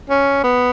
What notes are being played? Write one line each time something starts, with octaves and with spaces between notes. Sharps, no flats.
C#4
B3